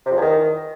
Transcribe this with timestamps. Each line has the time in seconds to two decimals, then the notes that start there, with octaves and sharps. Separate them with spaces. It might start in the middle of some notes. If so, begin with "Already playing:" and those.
0.06 C3
0.11 F2
0.16 E2
0.21 D#3